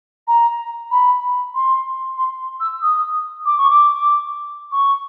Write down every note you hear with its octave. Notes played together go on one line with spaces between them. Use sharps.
A#5
B5
C6
C6
E6
D#6
D6
C#6
D6
C#6